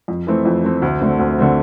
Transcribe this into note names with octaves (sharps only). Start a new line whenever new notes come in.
F2
E3 A3 C4
F2
E3 A3 C4
D2
D3 A3 C4
D2
D3 A3 C4